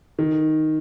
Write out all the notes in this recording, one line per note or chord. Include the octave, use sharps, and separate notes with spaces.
D#3